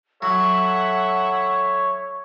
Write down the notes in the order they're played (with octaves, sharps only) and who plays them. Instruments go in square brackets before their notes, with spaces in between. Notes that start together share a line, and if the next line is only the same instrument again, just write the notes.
[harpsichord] F#3 [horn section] E4 A4 E5 [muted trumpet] C#5 [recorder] F#5